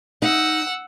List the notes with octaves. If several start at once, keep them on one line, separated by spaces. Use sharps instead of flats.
D#4 F#5 E6